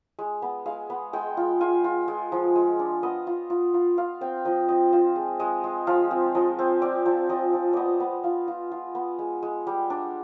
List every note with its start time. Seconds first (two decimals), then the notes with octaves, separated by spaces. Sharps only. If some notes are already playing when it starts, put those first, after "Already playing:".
0.19 G#3
0.42 B3
0.66 G#3 F5
0.90 B3
1.13 G#3 G5
1.37 F4
1.61 F4 G#5
1.84 F4
2.08 G#3
2.32 F3
2.56 G#3
2.79 D4
3.03 B3 D#5
3.27 F4
3.50 F4
3.74 F4
3.97 F4 F5
4.21 C4 G5
4.45 F3 D#5
4.68 C4 D#5
4.93 F4 C5
5.16 G#3
5.40 G#3 D#5
5.64 G#3
5.87 F3 F5
6.11 C4
6.35 F3 D#5
6.59 C4
6.82 C4 D5
7.06 F3
7.29 F3 D#5
7.53 F3
7.73 B3 D5 D#5
8.00 B3
8.24 F4 F5
8.48 F4
8.72 F4
8.95 B3
9.19 G#3
9.43 G#3
9.67 G3
9.90 D4